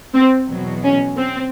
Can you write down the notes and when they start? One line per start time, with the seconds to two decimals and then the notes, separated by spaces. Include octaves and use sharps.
0.14 C4
0.48 E2 B2 F#3
0.83 C#4
1.17 C4